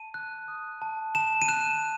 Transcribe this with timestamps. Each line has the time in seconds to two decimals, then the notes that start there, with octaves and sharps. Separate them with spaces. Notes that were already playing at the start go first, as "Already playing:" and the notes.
Already playing: A5 D#7
0.14 F#6
0.48 D#6
0.82 A5
1.15 A5 E7
1.42 D#7
1.48 F#6 E7